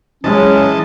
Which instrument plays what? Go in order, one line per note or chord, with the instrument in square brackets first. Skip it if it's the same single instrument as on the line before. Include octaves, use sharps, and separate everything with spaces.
[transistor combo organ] E3 D#5 A5 [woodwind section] F#3 C#4 [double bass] G#3